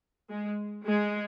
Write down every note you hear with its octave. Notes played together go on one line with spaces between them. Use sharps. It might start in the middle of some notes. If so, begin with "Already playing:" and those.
G#3
G#3